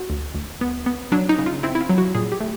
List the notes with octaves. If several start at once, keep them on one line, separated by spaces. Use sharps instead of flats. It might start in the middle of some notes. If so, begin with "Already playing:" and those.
Already playing: F#4
D2
D2
B3
B3
F#3 D4
D#4
C#3
F4
C4 E4
E4
F4
F#3
F#4
A#2 G#4
G4
A3